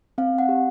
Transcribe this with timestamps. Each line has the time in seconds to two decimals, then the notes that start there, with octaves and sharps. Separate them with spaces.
0.18 C4 F5
0.39 F#5
0.49 G4